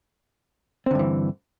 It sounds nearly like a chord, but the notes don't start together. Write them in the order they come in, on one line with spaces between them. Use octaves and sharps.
C4 D3 G2 E3